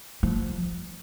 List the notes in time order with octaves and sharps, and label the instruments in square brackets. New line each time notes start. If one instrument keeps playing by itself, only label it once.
[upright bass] F3